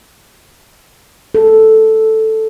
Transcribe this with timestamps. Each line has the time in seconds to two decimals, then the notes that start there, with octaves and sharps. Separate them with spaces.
1.35 A4